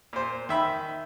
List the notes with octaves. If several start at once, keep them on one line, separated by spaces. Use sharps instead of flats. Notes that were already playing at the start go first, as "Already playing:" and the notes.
A#2 C5
D#3 E5 B5